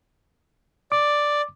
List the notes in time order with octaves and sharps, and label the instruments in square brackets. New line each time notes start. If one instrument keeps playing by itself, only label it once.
[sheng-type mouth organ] D5 [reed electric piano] D6